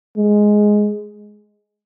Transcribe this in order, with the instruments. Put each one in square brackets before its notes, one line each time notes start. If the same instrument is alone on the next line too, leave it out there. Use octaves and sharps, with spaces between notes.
[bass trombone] G#3